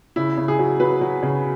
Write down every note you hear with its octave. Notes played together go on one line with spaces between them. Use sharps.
C#3 E4
C#3
G#4
F#3
F#3 B4
F#3
C#3